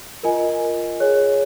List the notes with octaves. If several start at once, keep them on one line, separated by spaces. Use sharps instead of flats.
F4 A#4 D#5 G#5
G#4 C#5 G#5